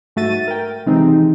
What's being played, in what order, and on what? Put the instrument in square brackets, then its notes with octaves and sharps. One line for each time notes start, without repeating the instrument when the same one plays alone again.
[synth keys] G#2 A3 F#4 E5 A6 D#7
A#4 G5
C3 D#3 E3 G#3 C4 D#4